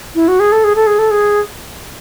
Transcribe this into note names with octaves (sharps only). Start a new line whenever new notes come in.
E4
F#4
G#4
A4
G#4
A4
G#4
A4
G#4